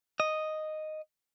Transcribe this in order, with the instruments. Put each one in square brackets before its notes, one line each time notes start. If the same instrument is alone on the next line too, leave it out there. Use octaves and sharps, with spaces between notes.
[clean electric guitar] D#5